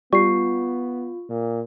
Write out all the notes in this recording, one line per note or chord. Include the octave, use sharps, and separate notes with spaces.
G3 B3 F4 C#6 C7
A#2